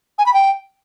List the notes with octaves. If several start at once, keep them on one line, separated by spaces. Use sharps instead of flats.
G#5
B5
G5